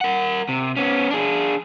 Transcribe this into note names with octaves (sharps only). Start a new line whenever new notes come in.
A#4 F#5
C3
B3 C#4
D4 G#4